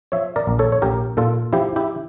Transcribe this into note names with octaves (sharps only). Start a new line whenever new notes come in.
F3 C#5 E5
A#4 D5
A#1
A4 C#5
C#5
A#1 G4 A#4
A#2 F4 A4
F3 E4 G4
E4 G4